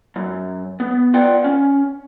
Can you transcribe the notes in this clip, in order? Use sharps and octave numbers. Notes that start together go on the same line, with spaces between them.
F#2
B3
F4 B4 D5 F#5 G5
C#4